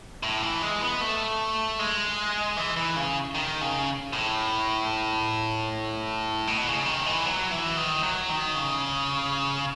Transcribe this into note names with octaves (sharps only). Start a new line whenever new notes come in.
A2
E3
G#3
B3
A3
G#3
E3
E3
C#3
D#3
C#3
A2
B2
C#3
D#3
E3
F#3
E3
D#3
F#3
D#3
C#3